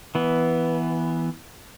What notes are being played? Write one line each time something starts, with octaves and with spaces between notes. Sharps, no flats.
E3 B3